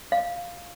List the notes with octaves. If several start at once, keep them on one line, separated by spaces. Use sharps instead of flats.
F5